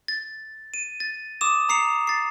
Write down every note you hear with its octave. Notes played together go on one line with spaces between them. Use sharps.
A6
D#7
A6
D6 D#6 E7
A#5 D#6 C7 C#7 F7
A6 C7